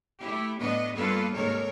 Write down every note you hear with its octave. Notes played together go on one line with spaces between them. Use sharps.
A3 E4 G4
A2 B3 D4 B4 D#5
G2 A#3 B3 F4 A4 B4
D#2 G#2 C3 A4 A#4 C#5